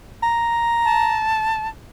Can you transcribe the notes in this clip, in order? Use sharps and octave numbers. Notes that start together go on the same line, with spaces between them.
A#5
A5